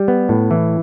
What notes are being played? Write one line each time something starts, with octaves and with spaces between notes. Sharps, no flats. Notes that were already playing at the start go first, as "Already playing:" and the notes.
Already playing: G3
B3
A2
E3